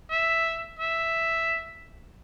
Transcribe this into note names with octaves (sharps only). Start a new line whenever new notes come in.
E5
E5